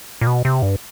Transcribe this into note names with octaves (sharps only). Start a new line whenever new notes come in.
A#2
B2
C3
G2